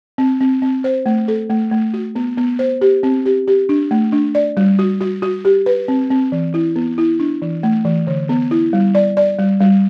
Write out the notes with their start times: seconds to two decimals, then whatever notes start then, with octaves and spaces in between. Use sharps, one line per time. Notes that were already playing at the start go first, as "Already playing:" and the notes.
0.18 C4
0.40 C4
0.62 C4
0.84 C5
1.06 A3
1.28 A4
1.50 A3
1.72 A3
1.94 F#4
2.15 B3
2.37 B3
2.59 C5
2.81 G4
3.03 C4
3.26 G4
3.47 G4
3.69 D4
3.91 A3
4.13 D4
4.35 D5
4.57 G3
4.79 F#4
5.01 F#4
5.22 F#4
5.45 G4
5.66 B4
5.88 C4
6.10 C4
6.32 E3
6.54 E4
6.76 B3
6.98 E4
7.20 D4
7.42 E3
7.63 A3
7.85 E3
8.07 D3
8.29 B3
8.51 E4
8.73 G3
8.95 D5
9.17 D5
9.39 G3
9.61 G3